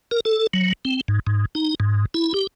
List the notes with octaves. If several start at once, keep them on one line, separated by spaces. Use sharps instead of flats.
A#4
A4
F#3
C4
G#2
G#2
D#4
G#2
E4
G4